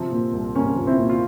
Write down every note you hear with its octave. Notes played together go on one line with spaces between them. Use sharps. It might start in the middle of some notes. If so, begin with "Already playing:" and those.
Already playing: C3 F3
A#2
C2
C2 A#3 C#4
F3
C4 E4
A#2
F4